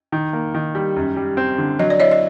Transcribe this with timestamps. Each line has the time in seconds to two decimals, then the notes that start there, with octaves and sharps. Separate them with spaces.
0.12 D#3
0.33 A#3
0.54 D#3
0.75 G3
0.96 F#2
1.17 G3
1.37 C4
1.58 D3
1.79 F#3 D#5
1.90 D5
2.00 E4 C#5 D#5
2.11 D#5